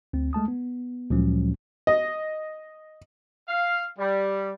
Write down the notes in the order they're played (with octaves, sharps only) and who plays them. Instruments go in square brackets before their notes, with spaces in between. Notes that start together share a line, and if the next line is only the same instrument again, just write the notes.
[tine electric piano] D2 C4
G#3 A3 A5 D#6
B3
D2 A#2 F3 F#3 G#3 C#4
[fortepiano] D#5
[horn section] F5
G3